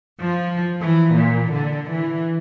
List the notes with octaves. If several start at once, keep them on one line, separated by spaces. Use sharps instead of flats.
F3
E3
A#2
D3
E3